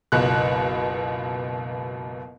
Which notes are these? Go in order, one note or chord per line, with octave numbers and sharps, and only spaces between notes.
F#1 C#2 B2 F#6